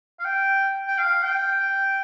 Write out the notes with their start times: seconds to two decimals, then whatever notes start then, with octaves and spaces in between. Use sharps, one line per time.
0.19 F5
0.25 G5
0.87 G5
0.98 F5
1.23 G5